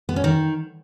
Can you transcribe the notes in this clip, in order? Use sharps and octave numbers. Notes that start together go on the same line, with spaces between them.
B3
C#4
D#3